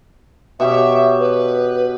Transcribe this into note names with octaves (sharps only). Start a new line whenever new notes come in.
B2 G4 C#5 E5
B4